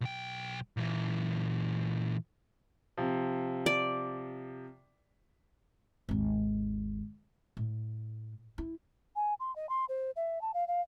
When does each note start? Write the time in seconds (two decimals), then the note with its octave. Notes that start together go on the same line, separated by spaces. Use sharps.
0.01 B1 G5
0.77 A#2 E3
2.97 C3 F3
3.66 D5
6.09 G#1 D#2
7.57 A2
8.58 E4
9.16 G#5
9.40 C6
9.56 D#5
9.69 C6
9.89 C5
10.16 E5
10.41 A5
10.54 F5
10.68 F5